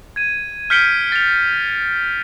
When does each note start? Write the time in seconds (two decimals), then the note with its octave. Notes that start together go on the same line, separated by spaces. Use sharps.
0.16 G#6 D#7
0.70 F6 G6 B6 C#7 D7 G7
1.12 A6 F7